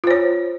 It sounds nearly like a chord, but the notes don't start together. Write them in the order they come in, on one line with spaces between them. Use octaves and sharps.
F4 C5 C#5